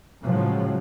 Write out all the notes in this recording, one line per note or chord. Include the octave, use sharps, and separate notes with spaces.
A2 C#3 F3 F#3 G#3